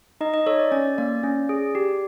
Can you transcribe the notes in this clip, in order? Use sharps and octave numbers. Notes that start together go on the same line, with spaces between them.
D#4 D#5
D#5
A4 C#5
D5
C#4 D5
A#3 D5
C#4
G#4
G4